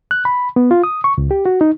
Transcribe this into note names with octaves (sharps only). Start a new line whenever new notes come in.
F#6
B5
B3
F4
D#6
C#6
C#2
G4
F#4
D#4